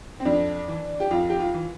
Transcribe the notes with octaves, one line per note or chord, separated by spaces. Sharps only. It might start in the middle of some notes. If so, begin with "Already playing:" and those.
C4
F2 D4
E3
G4
F2 F4
G4
F4
E3